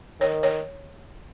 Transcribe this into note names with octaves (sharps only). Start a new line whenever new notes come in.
D#3 C#5
C#5